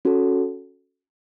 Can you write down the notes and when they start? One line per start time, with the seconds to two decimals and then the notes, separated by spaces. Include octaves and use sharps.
0.05 C#4 F#4 A4